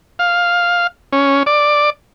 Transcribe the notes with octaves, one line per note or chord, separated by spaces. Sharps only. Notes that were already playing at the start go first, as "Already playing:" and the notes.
F5
C#4
D5